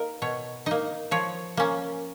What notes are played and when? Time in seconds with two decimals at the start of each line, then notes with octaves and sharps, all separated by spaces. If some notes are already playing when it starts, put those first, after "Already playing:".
Already playing: A#3 D#4 A#4
0.22 B2 C#5
0.66 A#3 D#4 D#5
1.11 F3 C#5
1.57 A#3 C#4